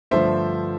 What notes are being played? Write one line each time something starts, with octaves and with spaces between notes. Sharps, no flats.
G2 D3 F3 A3 C5 E5